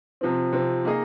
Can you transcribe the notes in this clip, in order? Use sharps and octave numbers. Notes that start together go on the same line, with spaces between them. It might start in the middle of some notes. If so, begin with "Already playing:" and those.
C3 F3 C4
C3 F3 C4
A#3 D#4 G#4 D#5